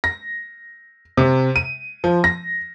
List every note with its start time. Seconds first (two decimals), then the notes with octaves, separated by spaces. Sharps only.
0.04 A#6
1.17 C3
1.56 D#7
2.04 F3
2.24 A#6